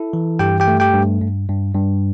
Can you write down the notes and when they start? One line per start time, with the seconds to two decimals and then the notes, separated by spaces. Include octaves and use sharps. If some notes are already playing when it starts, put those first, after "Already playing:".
Already playing: E4 A4
0.13 E3
0.39 G2 G4 G5
0.60 G4 G5
0.68 A3
0.80 G4 G5
0.94 G2
1.22 G2
1.49 G2
1.75 G2